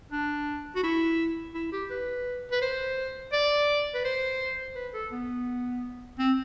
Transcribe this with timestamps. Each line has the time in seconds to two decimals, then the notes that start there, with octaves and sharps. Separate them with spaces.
0.12 D4
0.75 F#4
0.83 E4
1.55 E4
1.72 G4
1.90 B4
2.51 B4
2.62 C5
3.33 D5
3.94 B4
4.05 C5
4.76 B4
4.94 A4
5.12 B3
6.19 C4